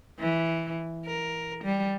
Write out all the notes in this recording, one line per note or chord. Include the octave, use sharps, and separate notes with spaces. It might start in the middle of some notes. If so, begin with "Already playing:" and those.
E3
A#4
G3